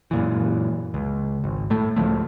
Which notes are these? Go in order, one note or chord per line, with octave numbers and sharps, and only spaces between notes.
F#2 A#2 E3
C#2
G#1
A2 A3
C#2 C#3 F3 A3